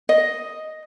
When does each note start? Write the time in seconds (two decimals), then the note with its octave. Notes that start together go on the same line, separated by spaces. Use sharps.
0.09 D#5